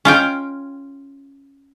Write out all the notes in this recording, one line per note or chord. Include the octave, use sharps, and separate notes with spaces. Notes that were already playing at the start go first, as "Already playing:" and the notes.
C#4 F4 G5